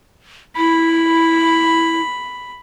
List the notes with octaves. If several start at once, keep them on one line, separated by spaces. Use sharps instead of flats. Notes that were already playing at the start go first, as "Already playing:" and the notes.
E4 B5